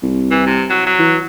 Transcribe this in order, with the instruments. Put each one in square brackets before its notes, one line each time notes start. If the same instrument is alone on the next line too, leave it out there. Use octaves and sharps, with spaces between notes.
[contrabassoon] C2
[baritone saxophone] E3
C3
F#3
F#3
[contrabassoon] E3